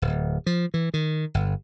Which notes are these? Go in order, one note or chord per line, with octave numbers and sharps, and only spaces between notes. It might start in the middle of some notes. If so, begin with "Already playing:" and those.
D1
F3
E3
D#3
G1